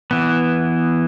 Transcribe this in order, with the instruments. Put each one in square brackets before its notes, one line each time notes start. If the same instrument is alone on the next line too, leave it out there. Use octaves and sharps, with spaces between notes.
[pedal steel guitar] E3 B3